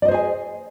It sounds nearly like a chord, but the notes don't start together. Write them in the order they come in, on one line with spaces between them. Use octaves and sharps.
D5 D#5 C5 G#4 G#5